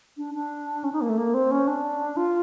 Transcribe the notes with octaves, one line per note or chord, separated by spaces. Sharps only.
D4
D4
C#4
D#4
A#3
A3
A#3
C4
C#4
D4
F4